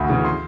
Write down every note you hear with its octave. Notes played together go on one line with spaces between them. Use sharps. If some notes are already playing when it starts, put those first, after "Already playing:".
Already playing: D2 B5
C#3 E3
C6